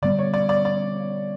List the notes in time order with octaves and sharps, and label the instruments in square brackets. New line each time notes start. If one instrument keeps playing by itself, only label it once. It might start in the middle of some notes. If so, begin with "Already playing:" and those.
[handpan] D3 G3 B3 [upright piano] D5
[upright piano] C#5
D5
D5
D5